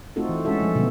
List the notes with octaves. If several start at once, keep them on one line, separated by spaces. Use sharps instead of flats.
A3 C4 D#4 F4 F#4 A4
E3
G#3 C#4 F#4 A4 E5
F3 A3
B2 D3 G3 B3